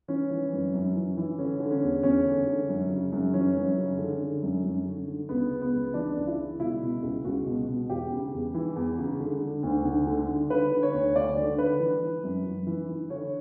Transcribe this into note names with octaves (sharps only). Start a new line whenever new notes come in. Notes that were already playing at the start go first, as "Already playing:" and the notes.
E3 C#4
E3
F#2
F#2
E3
E3
D3 C#4
D3
C#4
E2
E2 C#4
D3
D3
F#2
C#3
F#2
E3 C#4
F#2
C#3
D3
D3
F#2
F#2
D3
D3
C#2 B3
C#3
B3
C#2
E3 D4
C#2
E4
C#3
B2 E4
B2
C#2
C#2 F#4
B2
B2
E2 G4
C#3
E2
E3
E2
C#3
D3
D3
D2
D2
D3
D3
D3 B4
D3
C#5
D2
D2 D5
D3
D3 B4
E3
E3
F#2
F#2
E3
E3
D3 C#5